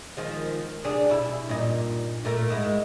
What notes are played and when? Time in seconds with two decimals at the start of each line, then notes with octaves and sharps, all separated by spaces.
0.17 D#3 F3 G#3
0.84 C3 D4 G#4
1.09 B2 E4
1.47 G2 A#2 D#4
2.25 A#2 A3 A#4
2.49 G#2 G#3 E4